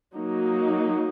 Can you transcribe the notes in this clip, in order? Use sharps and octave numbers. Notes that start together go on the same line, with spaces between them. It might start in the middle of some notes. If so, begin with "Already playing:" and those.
F#3 A#3 D#4